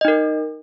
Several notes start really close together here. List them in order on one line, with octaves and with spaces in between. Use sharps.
D#5 D#4 A#4